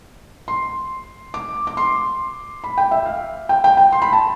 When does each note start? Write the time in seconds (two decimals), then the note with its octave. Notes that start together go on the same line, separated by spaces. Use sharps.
0.48 C6
1.34 D6
1.67 D6
1.77 C6
2.64 B5
2.78 G5
2.91 E5
3.06 F5
3.49 G5
3.64 G5
3.77 G5
3.92 C6
4.02 B5
4.13 A5